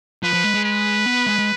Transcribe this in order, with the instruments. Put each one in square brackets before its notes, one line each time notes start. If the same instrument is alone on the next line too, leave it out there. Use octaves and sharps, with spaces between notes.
[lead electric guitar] F3 [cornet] B4
[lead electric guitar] F3
G#3
G#3
[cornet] B4
[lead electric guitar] B3
G#3
G#3